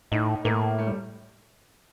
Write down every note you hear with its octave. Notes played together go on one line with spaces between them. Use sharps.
A2 D#4
A2 A#3
A3
G3